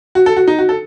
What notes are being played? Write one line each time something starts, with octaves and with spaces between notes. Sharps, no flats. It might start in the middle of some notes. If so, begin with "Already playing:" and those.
F#4
A4
F#4
D#4
F#4
A4